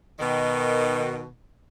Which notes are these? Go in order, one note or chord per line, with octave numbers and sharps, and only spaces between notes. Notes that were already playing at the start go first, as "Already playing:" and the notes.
B2 D#3